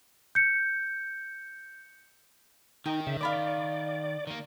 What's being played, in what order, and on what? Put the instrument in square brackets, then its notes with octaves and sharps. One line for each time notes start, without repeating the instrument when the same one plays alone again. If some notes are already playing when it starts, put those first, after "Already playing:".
[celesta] G6 C#7
[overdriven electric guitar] D#3 [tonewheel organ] D#4 [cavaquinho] G5
[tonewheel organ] C#3 E5
[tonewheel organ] D5 [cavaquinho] F5 B5 D6
[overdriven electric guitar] D#3 A#3